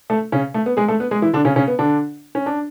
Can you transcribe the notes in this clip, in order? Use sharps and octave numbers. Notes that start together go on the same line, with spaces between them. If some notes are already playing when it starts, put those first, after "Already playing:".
A3 A4
C#3 C#4
A3
B3
G#3 G#4
A3 A4
B3 B4
G#3 G#4
E3 E4
D3 D4
C#3 C#4
C#3 C#4
B3
D3 D4
C#4
D4